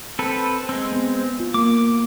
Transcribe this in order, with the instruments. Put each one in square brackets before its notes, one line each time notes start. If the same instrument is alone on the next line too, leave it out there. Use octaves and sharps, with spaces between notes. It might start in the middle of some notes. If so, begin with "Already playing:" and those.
[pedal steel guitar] C4 A4 B4
G#3 C4
[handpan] B3
F4
[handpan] A#3 [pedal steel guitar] D6